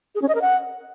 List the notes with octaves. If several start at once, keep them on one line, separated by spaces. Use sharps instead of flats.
G#4
C#4
D#5
A#4
F#5